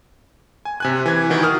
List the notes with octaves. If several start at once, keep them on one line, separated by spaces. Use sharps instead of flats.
G#5
C3 G#5 F#6
E3 G#6
D#3 E3 F#4
F#4 D#6 F6